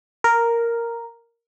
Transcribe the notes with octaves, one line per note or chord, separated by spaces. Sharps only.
A#4